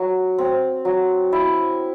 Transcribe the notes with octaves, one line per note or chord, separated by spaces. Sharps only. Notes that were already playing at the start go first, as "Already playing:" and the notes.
Already playing: F#3
C4
F#3
E4